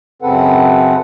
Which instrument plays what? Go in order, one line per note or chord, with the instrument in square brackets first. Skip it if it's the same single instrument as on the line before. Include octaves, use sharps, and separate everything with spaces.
[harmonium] F#2 C#3 C4 A4 B4 F#5